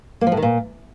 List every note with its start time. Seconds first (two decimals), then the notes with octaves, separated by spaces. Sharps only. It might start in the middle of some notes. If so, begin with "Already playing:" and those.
0.21 A#3
0.27 F3
0.32 A2
0.37 D#3
0.42 A#2